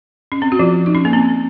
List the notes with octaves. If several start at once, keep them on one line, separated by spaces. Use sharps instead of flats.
C#4
C4
F#4
F3 F4
D#4
C#4
A#3
C4